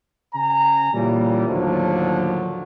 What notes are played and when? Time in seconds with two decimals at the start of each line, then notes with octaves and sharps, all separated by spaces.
0.34 C#3 G#5 A#5
0.93 A#2 C#3 E3 G3
1.48 D#2 A2 D3 F3 F#3